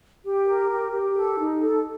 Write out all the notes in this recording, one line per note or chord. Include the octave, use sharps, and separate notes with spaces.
G4
A#4
G4
G4
A4
D#4
A4